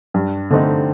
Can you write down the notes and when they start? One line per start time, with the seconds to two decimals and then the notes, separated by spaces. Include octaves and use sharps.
0.14 G2
0.51 D3 A3 C4 D#4